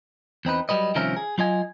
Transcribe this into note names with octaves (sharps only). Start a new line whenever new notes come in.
E2 C4 D#4 B4
F#3 G3 B4 D#5
C2 D#3 F3 C#4 A#4 E5
G#4
F#3 F4 D#5 G#5